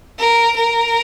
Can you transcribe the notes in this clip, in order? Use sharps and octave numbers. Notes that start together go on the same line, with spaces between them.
A#4
A#4